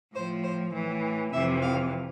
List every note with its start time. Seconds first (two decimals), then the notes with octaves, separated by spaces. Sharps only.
0.14 A2 F3 C5
0.43 C5
0.74 A2 E3
1.32 F2 C3 E3 E5
1.61 F5